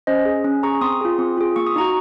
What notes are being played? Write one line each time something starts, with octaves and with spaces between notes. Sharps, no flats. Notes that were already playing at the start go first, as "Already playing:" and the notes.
C#4 C5 D#5
G#4
C#4
G#4 A#5 C#6
C4 C6 D#6
F4 G#4
C4
F4 G#4
A#3 C#6
D#6
D#4 F#4 A#5 C#6